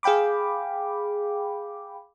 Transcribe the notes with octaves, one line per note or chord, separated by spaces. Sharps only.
G#4 F5 G5 B5 D6